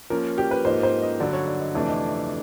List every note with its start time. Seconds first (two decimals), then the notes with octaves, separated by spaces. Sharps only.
0.10 F3 A#3 C#4 A#4
0.38 G4
0.51 B4
0.65 G#2 F3 A#3 D#4 C5
0.83 C5
1.02 D#5
1.20 G2 D3 F#3 D5
1.33 C#5
1.48 D5
1.61 D#5
1.75 F2 C3 E3 A3 D4 D5
1.88 D#5